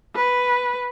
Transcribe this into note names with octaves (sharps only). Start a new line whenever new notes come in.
B4